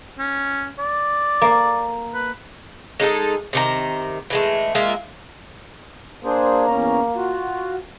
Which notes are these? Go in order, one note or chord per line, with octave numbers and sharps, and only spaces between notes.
C#4
D5
A#3
B4
G#3 D#4 F4 A4
C3 D#3 A#5
E3 G#3 A3
G#3 A#3 F4 E5
A#3 D4 G#4 C5
E2 C#4 A#5
F4 F#4